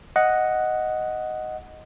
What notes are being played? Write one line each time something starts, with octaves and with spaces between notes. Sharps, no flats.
D#5 F#5